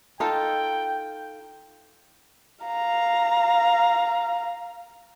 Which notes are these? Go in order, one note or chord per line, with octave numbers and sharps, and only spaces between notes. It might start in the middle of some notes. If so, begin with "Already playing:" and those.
D#4 F4 A4 G5
F5 A#5